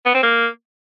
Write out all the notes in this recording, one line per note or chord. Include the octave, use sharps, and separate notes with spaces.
B3
C4
A#3